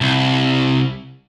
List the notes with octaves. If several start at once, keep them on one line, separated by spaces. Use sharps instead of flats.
C2